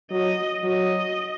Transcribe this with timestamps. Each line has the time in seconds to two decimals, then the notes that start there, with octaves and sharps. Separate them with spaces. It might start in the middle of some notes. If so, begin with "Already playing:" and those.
0.10 F#3 D#5
0.63 F#3 D#5